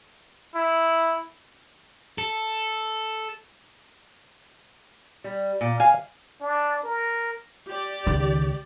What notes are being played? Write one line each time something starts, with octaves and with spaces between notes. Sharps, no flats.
E4
A4
G3
A#2
F5 G#5
D4
A#4
G4 D5
C#2 D#3